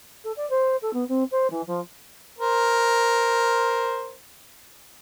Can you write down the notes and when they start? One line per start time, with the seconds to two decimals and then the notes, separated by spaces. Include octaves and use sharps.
0.24 A4
0.36 D5
0.50 C5
0.82 A4
0.93 B3
1.08 C4
1.31 C5
1.50 E3
1.67 F3
2.39 A#4 C5